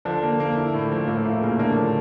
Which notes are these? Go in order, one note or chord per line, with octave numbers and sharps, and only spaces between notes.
D3 F3 D4
A#3
A#3
E4
A2
F3
A#3
A2 A3 E4
A#2 A#3 E4
C#3 A#3 C#4
D3 A#3 D4
F3